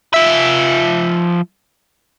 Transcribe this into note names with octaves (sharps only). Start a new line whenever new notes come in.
F3 E5